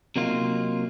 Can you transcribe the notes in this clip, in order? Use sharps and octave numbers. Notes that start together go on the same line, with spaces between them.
C3 F#3 A#3 D#4 F4